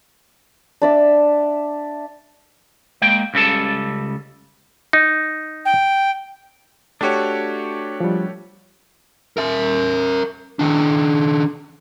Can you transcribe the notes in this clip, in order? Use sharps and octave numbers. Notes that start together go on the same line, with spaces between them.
D4 D5 E5
G#3 A#3 G5
C#2 C#3 G3 A4 A5
D#4
G5
A3 D4 F#4 G4 C#5
F3 G3
A#4 E5
D#3 D4